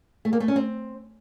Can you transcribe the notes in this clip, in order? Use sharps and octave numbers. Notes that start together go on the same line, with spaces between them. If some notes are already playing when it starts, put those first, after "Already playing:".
A3
A#3
A3
C#4
C4